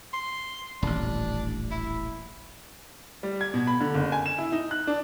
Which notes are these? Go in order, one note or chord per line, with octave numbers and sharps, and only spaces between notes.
C6
D#1 A1 D4
E4
G3
G#6
B2
B5
D3
F#1
G#5
E7
E4
D#4
F#6
D4